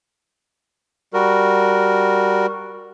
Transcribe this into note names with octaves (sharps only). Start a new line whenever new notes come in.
G3 F#4 A#4